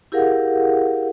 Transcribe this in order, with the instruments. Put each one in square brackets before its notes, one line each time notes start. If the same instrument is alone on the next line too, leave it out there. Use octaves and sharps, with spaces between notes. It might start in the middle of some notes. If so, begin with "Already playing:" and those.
[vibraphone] E4 G4 G#4 A#4 F5 F#5